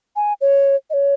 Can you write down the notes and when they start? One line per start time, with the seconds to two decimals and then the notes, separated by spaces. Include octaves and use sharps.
0.16 G#5
0.41 C#5
0.90 D#5
0.93 C#5